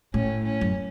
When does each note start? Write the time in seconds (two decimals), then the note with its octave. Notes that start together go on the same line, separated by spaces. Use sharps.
0.14 A2 C#4
0.43 C#4
0.61 F#2